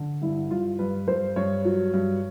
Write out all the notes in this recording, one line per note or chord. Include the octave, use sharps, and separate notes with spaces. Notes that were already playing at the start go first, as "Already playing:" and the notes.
Already playing: D3
G2 E4
G2 F4
G2 B4
G2 C5
G2 C#5
F#3
G2